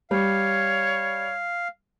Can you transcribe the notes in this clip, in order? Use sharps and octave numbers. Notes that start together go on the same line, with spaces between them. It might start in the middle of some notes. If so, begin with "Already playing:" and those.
G3 C#5 F5